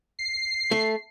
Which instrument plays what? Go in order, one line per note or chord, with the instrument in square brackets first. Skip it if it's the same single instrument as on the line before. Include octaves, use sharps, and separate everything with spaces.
[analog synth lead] C7
[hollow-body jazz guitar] A3